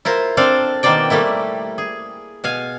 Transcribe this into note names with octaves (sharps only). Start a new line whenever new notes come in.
E4 F4 A#4 C5
C4 D4 A4 C5 D5 F5
B2 D#3 A#3 C5 D5 G5
G3 A3 A#3 E4
G#4
B2 F5 G#5